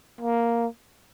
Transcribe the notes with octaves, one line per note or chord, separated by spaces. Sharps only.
A#3